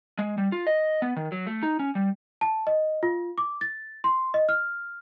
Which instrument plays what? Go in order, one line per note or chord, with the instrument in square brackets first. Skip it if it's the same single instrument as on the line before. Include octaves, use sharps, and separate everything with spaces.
[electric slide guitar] G#3
G3
F4
D#5
B3
D#3
F#3
A3
D#4
C#4
G3
[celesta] A5
D#5
F4
D6
A6
C6
D#5
F6